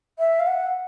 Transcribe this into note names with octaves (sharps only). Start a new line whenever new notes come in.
E5
F5
F#5